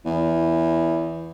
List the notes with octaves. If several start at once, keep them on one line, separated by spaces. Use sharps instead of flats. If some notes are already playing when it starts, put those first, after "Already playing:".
E2